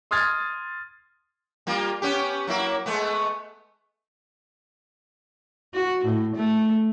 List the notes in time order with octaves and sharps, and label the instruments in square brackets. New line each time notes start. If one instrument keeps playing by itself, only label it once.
[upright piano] C6 D#6 F6 G#6 A6
[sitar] G3 A#3 F4
B3 C#4 G4
F#3 A#3 E4
G#3 A3 B3
[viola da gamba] F#4
A2
A3